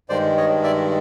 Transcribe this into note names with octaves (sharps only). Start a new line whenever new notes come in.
G2 D#3 G#3 C5 D5
C#5 D#5
D5 E5